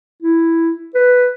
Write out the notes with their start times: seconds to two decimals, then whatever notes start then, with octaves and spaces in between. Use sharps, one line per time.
0.23 E4
0.94 B4